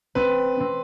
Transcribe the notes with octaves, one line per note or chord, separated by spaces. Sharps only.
C4 B4
C4